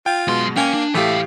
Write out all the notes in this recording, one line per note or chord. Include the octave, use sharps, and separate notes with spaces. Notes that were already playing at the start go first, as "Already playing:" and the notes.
F4 G5
F#2 B2 G#3 C6
A#3 C#4 G5 G#5
D4
A2 E3 A3 G4 F5